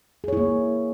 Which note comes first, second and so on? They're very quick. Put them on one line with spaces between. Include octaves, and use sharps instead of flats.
G#4 C#5 E4 A#3